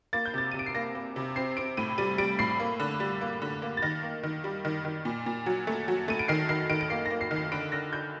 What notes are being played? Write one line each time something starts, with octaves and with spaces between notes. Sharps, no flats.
A#3 A6
G6
C3 A6
C3 D#7
D7
C7
A#3 A#6
A#3
C3
C4 C7
C4 D7
A2 D#7
G3 D#7
G3 D7
A2 C7
A#3
D3
G3
A#3
D3
A#3
A6
D#3 A#6
A#3
D#3
G3
D#3
D#3
A#2
A#2
F#3
A3
F#3
A3 D#7
D7
D#3 C7
D#3 C7
D#3 D7
D7
A#3 C7
A#3 A#6
C7
D#3
C7
D3 D7
D3 A#6
D3 G6